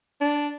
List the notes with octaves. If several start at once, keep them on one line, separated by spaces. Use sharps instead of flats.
D4